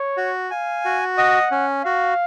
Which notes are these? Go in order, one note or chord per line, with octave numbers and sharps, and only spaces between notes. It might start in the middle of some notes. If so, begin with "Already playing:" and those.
Already playing: C#5
F#4
F5 G#5
F#4
D#5 F#5
C#4
F#4 F5